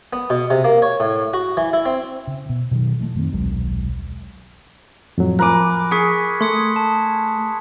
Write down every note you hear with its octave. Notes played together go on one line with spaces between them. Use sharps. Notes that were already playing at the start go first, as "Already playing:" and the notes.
B3
B2
C3
A#3
C#5
A2
F#4
E3
E4
C4
C#3
B2
B2 D#3 F3 F#3
E3 G#3 A3
F#2 D#3 C4
D#1 B1 F#3 G#3
F2 A2 F#3
F3 A#4 G#5 B5 D6 F#6
G#4 C#6 B6 C#7
A3 C6 D#6 C#7
A5